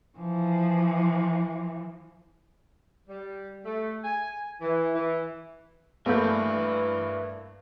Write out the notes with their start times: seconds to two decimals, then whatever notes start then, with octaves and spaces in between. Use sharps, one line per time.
0.18 E3 F3
3.08 G3
3.65 A3
4.04 G#5
4.61 E3
4.95 E3
6.06 G2 A3 A#3 B4 E5 G6